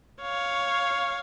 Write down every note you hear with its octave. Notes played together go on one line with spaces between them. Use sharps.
C#5 F5